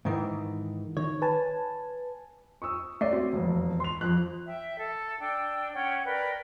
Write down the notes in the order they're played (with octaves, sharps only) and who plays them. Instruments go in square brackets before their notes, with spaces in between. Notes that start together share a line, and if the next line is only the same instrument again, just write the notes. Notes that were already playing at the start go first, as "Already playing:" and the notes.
[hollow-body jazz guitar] G#2 D#3 E3
[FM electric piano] D#3 [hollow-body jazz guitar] C#5
[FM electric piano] B4 G#5 A5
[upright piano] C#6 D#6 E6
[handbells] A3 C#5 D5 [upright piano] C7
[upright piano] C4 [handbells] F#4
[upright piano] E1 F2
C6 F7
F2 F3 F#6
[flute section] E5 G5
A4
D4 G5 E6
C#4 C#5 F#5 G5
A#4 B4 D5 G5